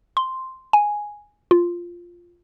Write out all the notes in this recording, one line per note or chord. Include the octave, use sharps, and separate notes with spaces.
C6
G#5
F4